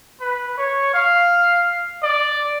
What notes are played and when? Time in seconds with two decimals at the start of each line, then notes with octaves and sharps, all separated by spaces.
0.21 B4
0.58 C#5
0.94 F5
2.03 D5